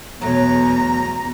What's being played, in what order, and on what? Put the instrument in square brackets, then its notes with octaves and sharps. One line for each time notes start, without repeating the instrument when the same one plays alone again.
[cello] E2 [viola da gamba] B2 [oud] F#3 A3 [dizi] A#5